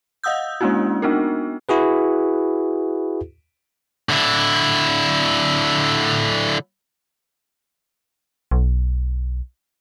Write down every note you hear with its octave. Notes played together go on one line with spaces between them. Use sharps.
D#5 F5 F#5 D#6 E6 G6
G#3 A#3 C#4 D4 E4 F#4
B3 D4 D#4 F#4 A#4
E4 F#4 G#4 B4
D3 E4
B1